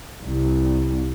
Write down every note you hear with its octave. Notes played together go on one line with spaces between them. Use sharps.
C2